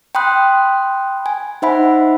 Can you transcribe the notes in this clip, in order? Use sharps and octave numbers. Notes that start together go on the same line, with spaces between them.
G5 B5 C6 D#6 F#6
G#5
D#4 C5 E5 F#5 G#5 B5